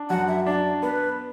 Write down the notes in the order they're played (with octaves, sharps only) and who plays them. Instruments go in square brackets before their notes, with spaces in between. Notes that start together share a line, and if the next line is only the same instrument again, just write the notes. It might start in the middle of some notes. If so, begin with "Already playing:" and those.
Already playing: [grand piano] D4
[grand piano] F#2 [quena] F#5
[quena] E5
[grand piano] D4 [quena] D5
[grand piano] B3 [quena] B4